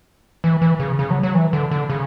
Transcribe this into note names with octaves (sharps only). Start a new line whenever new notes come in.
E3
E3
C#3
C#3
F#3
F#3
E3
D3
D3
C#3